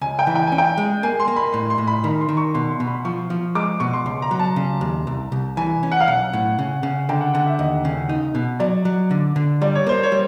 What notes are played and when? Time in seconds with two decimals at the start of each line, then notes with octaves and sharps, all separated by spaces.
0.01 C#2 G#5
0.19 G5
0.27 E3
0.35 G5
0.47 C#4 G#5
0.58 G5
0.77 G#3
1.03 A#3 G#5
1.20 C6
1.28 A#3
1.36 B5
1.53 A2 C6
1.70 C6
1.78 A2
1.87 B5
2.04 D#3 B5
2.21 C6
2.29 D#3
2.37 C#6
2.54 B2 C6
2.71 C6
2.80 B2
2.87 B5
3.05 F3 C#6
3.30 F3
3.55 G#3 D6
3.80 B2 C#6
3.93 C6
4.06 C#2 C6
4.22 A#5
4.31 F#3
4.39 A5
4.56 C#3
4.81 D#2
5.07 C2
5.32 C2
5.57 E3 G#5
5.83 C#4
5.91 F#5
6.00 F5
6.08 B1 F#5
6.33 A2
6.59 C#3
6.83 C#3
7.09 D3 G5
7.21 F#5
7.34 D3 F#5
7.46 E5
7.59 D#2 D#5
7.85 C#3
8.09 D#4
8.35 B2
8.60 F#3 D5
8.85 F#3
9.11 D3
9.36 D3
9.62 G3 D5
9.75 C#5
9.87 A#3 C5
10.03 C#5
10.12 G3